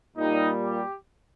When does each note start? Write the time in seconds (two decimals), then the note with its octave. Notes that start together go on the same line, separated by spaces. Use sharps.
0.17 A#2 G3 D#4
0.64 G4